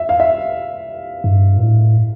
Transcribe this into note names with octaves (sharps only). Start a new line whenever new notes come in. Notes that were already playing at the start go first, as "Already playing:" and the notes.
Already playing: E5
F5
E5
G2
A#2
A2